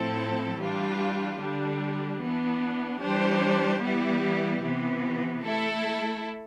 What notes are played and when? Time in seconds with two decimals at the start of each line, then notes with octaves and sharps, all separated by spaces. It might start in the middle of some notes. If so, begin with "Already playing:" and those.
Already playing: A2 F3 C4 E4 A4
0.59 E3 G3 D4 F4
1.40 D3 G3 D4
2.20 E3 B3 D4
3.01 E3 G3 D4 G4 C5
3.83 E3 G3 B3 E4 G4
4.63 C3 E3 B3
5.44 A3 E4 A4